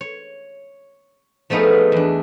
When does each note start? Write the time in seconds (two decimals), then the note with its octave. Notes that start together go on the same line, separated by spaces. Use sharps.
0.01 C#5
1.50 F3 A3 B3 D#4 G#4 A#4
1.92 E2 D4